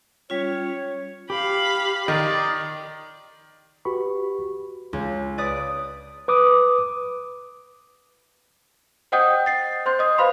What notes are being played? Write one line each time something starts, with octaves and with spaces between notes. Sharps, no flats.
G3 C#4 F4 C#5
G4 F5 B5
D#3 D5 D#5 A#5
F#4 G4 B4 B5 C#6
C#2
B4 D5 D#6
B4 D6 D#6
C5 D#5 F#5 G5 D#6 G6
A6 C7
C5 C6 G6
D#5 D#6
B4 C5 F5 B5 C6